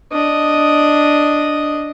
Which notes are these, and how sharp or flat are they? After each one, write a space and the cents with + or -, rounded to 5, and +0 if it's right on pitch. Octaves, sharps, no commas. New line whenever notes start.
D4 +0 D#5 +0